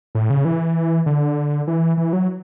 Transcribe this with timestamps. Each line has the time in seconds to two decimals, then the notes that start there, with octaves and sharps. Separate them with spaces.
0.15 A2
0.30 C#3
0.45 E3
1.06 D3
1.67 E3
1.97 E3
2.13 F#3